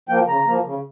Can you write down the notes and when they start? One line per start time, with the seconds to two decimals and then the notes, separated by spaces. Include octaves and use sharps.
0.09 F3 A#3 G5
0.27 C#3 A#5
0.46 F3 A#3
0.65 C#3